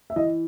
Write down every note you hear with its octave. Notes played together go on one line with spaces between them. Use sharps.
E5
E3 D#5